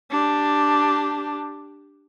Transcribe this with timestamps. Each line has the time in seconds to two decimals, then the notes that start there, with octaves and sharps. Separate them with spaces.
0.10 D4 G4